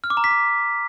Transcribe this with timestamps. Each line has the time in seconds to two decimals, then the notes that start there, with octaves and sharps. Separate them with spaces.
0.04 F6
0.10 D6
0.17 A#5
0.24 B6
0.31 D6